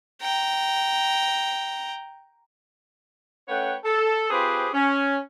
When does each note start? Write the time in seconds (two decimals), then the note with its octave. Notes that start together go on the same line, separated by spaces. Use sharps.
0.21 G5 A#5
3.48 A3 C#4 B4 C#5 F#5 G5
3.85 A4
4.30 C4 F4 G4 G#4 B4 C5
4.74 C#4